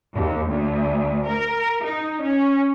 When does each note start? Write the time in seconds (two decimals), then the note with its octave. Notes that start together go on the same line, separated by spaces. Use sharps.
0.14 D#2
0.50 D2
1.27 A#4
1.85 D#4
2.23 C#4